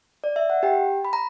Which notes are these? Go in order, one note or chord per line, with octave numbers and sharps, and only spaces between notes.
D5
E5
F#5
G4 G5
B5
A#5